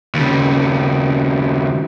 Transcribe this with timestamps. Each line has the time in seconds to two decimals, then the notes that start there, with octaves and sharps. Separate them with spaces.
0.14 D#2 C#3